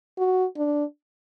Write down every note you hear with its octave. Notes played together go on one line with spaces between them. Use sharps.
F#4
D4